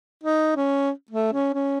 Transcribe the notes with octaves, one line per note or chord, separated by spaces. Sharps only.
D#4
C#4
A3
C#4
C#4